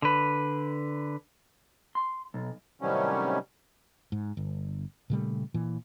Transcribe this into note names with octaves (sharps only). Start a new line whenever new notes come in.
D3 B4
C6
B1
A2 C3 D#3 F#3 G3 C#4
G#2
G1
A#2 C#3 G3 A3
A#2 E3